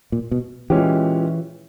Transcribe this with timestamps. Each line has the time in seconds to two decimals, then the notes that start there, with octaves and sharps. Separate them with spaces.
0.12 A#2
0.31 B2
0.70 A#2 E3 G#3 C#4 G4